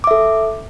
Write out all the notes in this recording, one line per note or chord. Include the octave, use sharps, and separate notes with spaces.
A4 E5 D6